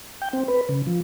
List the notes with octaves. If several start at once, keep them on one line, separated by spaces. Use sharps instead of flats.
G5
C4
B4
C#3
F3